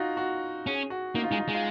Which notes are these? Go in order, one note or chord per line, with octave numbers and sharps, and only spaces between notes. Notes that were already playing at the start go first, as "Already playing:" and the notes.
Already playing: D#4 F4 F#4
F#4
C#4 G#4
F#4
A#3 D#4
F4
G#3 D#4
F4
G#3
F4